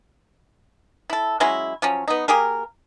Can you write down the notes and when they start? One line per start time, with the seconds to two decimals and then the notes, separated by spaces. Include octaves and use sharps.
1.10 E4 A4
1.40 F#3 G#3 C#4 E4
1.82 F3 F#3 C#4
2.08 B3 D#4
2.28 A#3 G4 G#4 A#4